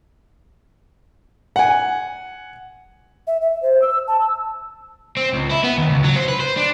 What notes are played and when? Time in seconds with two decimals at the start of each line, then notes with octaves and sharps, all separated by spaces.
1.56 F#5 G#5
3.27 E5
3.42 E5
3.62 C5
3.82 E6
4.08 A5
4.21 E6
5.17 C4
5.33 C#2
5.51 E4
5.64 B3
5.78 D#2
5.90 C#2
6.04 F#3
6.16 C5
6.29 B4
6.40 C5
6.57 D4